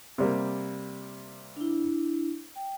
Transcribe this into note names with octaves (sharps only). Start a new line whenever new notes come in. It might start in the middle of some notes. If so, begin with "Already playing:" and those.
C3 G3 A#3
D4 E4
G5